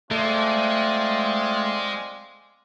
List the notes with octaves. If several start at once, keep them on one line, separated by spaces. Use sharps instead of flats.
G#3 A3 C4 F4 D5